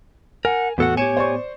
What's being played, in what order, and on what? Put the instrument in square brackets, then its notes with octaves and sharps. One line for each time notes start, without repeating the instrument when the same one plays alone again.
[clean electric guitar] A#4 [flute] F#5 [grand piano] G#5
[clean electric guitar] E2 A4 F#5 [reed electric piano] A2 B3 [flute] F#4
[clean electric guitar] G4 G#5 [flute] C#5 [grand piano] C#7 E7
[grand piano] C5 D5 C#6